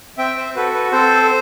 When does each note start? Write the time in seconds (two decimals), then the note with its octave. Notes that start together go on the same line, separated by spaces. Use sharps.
0.17 C4 E5 G5
0.36 C5 E5
0.55 F#4 A4 B4
0.74 B4
0.92 C4 A4 C5